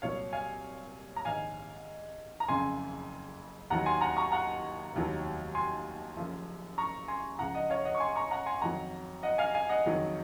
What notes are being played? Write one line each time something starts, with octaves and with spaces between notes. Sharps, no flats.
C2 A#2 F#3 C#5 F5
F5 G#5
A#5
A#1 G#2 D#3 F5 G#5
A#5
F#1 F2 C#3 G#5 C6
D#2 D#3 F#3 F#5 A#5
G#5 C6
F#5 A#5
A#5 C#6
F#5 A#5
F1 D#2 D#3 F#3
G#5 C6
F#1 F#2 F3
A#5 C#6
G#5 C6
C#2 C#3 F3 F#5 A#5
D#5 F#5
C#5 F5
D#5 F#5
C#6
G#5 C6
A#5 C#6
F#5 A#5
G#5 C6
F2 D#3 F#3 F#5 A#5
D#5 F#5
F5 G#5
F5 G#5
D#5 F#5
F#1 F2 D#3 F#3